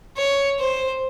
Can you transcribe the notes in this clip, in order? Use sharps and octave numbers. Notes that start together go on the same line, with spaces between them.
C#5
C5